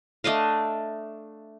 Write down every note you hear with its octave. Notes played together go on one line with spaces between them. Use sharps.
A3 D4 D#5 F5